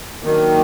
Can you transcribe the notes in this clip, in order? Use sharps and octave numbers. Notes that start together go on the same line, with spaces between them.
D#3 F#3 A#3 D4